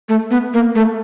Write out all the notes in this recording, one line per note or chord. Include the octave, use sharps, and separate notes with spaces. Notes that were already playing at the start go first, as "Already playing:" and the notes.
A3
B3
A#3
A3